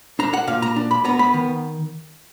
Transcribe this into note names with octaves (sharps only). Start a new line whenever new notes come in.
D4 A#5
F#5
A#2 F5
A#5
D4
B5
B3 A#5
B5
D#3